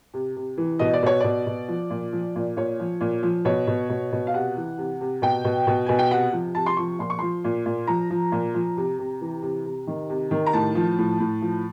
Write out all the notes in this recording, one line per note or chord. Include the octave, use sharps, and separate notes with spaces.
C3
C3
E3
B2 D#5
D5
B2 C#5
B2 D5
B2
F3
A#2
F3
A#2
A#2 C#5
F3
A#2
F3
B2 C#5
B2
B2
B2
F5
C3 F#5
E3
C3
C3
B2 G5
B2
B2
B2 G#5
G5
C3 F#5
F3
C3 A5
C6
F3 C#6
A#2 C6
C#6
F3 C6
A#2
A#2
F3 A#5
F3
A#2
F3
C3
C3
E3
C3
C3
D#3
C3
D#3
A#5
A2 A5
F3
A2
A2
F3